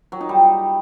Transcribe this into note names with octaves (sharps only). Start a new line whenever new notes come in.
F#3
D#4
G3